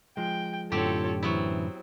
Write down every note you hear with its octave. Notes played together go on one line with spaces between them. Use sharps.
F3 G#3 G5
F#2 A2 D3 C4 F4 G4 A4 C#5
E3 F#3 B3 C4 E4